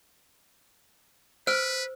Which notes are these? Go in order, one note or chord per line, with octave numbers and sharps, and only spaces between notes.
B4 C5 E6 F6 D7